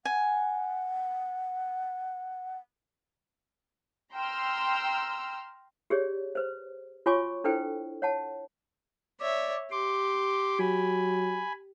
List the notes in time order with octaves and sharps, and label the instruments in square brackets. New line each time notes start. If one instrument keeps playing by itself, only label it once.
[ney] F#5 [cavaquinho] G#5
[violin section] G5 A#5 C6 E6 F6
[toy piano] G4 G#4 C#5 D5
B4 C5
F4 F#4 C#5 G#5 C#6 D6
D4 E4 A4 B4 C5 G5
C#5 F#5 A5
[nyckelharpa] C#5 E5 [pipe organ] D5
[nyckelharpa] G4 [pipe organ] C6 D6
[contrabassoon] F#3 [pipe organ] G#5 B5